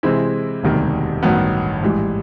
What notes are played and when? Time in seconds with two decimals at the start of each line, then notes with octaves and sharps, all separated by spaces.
0.03 C3 E3 G#3 C4 E4
0.63 E1 D2 C3 D#3 G3
1.23 A1 G2 D#3 F#3 B3
1.82 A1 G#2 E3 G3